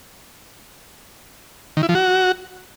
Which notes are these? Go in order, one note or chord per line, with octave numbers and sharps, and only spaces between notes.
D#3
E4
F3
F#4